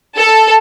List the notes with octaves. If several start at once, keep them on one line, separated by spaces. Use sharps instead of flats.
A4